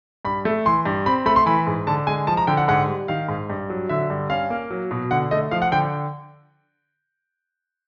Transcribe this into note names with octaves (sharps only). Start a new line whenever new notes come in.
G2 B5
A3
E3 C6
G2
C4 B5
A3 B5
C6
E3 B5
G#2
D3 A5
G#3 G#5
F3 A5
A#5
D3 G5
F#5
G#2 F#5
G3
D#3 F5
G#2
G2
F#3
D3 E5
G2
C#4 F5
A#3
F#3
B2
D3 F#5
A3 D#5
F3 F5
F#5
D3 G5